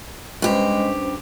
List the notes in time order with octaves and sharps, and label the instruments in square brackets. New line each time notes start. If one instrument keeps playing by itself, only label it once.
[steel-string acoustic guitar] G2 G4 [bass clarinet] G#3 [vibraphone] C#4 C5